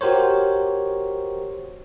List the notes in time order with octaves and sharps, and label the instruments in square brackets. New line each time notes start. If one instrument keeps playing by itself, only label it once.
[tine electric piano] F#4 G4 A#4 C5 C#5